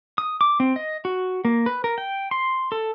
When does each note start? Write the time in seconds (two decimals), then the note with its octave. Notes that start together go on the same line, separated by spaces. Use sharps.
0.18 D#6
0.41 D6
0.60 C4
0.76 D#5
1.05 F#4
1.45 A#3
1.66 B4
1.84 A#4
1.98 G5
2.31 C6
2.72 A4